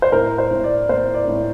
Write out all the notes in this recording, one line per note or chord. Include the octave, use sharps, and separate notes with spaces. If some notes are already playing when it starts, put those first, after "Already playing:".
C5
A2 A#4
C5
A2
D5
A#3 C5
D5
A2